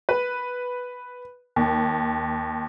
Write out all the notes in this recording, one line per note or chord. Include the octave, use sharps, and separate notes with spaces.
B4
D#2